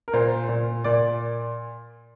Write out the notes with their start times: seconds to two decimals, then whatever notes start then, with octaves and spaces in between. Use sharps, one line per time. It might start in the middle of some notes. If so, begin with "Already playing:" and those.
0.08 A#4
0.13 A#2 C5
0.49 A#2
0.84 A#2 D5